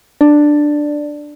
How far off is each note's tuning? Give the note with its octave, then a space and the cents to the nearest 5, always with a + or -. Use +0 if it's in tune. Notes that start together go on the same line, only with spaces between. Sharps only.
D4 +10 D5 +5